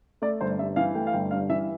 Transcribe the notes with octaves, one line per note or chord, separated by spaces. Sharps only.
A3 D5
G1 C5
G2 E5
E3 F5
A3 G5
F5
G1 G5
G2 F5
E3 E5